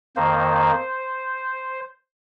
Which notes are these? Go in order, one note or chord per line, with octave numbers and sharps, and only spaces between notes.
F2 D#3 A#3 C5